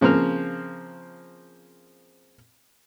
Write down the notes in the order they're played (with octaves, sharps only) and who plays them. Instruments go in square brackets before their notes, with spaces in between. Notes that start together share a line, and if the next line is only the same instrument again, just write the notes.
[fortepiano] C#3 F3 A#3 C4 F6